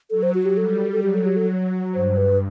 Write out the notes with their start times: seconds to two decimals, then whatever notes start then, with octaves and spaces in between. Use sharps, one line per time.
0.10 F#3 A4
0.23 C5
0.34 F#4
0.45 G4
0.57 G3 A4
0.92 A4
1.02 F#3 G4
1.14 A4
1.26 G4
1.36 A4
1.94 G2 C5
2.17 B4